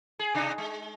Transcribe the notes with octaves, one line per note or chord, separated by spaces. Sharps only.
G#4
C3 D4 D#4
G#3